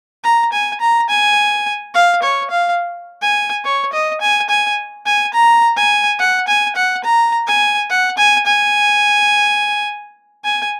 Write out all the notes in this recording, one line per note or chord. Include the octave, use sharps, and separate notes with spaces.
A#5
G#5
A#5
G#5
F5
C#5
F5
G#5
C#5
D#5
G#5
G#5
G#5
A#5
G#5
F#5
G#5
F#5
A#5
G#5
F#5
G#5
G#5
G#5